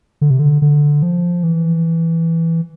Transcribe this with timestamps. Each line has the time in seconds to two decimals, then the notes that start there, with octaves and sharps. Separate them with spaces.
0.21 D3
0.30 C3
0.39 D3
0.62 D3
1.02 F3
1.43 E3